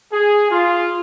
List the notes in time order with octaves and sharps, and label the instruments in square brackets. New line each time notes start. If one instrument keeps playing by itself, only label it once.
[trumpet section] G#4
F4